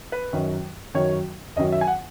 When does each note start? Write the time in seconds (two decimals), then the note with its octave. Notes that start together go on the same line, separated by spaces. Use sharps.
0.12 B4
0.33 F#2 D#3 F#3
0.94 F#2 D#3 F#3 C#5
1.56 F#2 D#3 F#3 D#5
1.72 E5
1.81 G#5
1.87 F#5